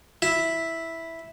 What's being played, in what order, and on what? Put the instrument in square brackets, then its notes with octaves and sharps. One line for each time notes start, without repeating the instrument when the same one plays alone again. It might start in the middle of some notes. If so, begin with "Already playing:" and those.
[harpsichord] E4